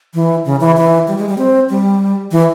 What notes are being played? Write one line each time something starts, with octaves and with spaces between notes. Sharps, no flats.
E3
C#3
E3
E3
G3
G#3
G3
C4
G3
E3